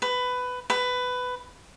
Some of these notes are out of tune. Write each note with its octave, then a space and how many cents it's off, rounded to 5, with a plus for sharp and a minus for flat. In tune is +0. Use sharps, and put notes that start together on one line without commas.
B4 +15
B4 +15